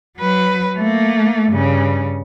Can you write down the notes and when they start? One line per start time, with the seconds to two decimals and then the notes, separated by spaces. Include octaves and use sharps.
0.18 F#3 B4
0.77 A3 A#3
1.51 G2 C#3